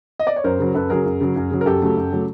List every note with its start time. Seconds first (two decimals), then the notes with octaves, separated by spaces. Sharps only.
0.19 D#5
0.27 D5
0.36 C#5
0.44 F#2 A#4 C5
0.59 C#3 F#3
0.74 F#2 A4 B4
0.90 C#3 F#3 G#4 A#4
1.06 F#2
1.21 C#3 F#3
1.36 F#2
1.51 C#3 F#3
1.61 A#4
1.66 F#2 G4 A4
1.82 C#3 F#3 A3
1.97 F#2
2.12 C#3 F#3 A3